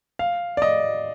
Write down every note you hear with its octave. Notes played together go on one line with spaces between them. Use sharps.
F5
D5
D#5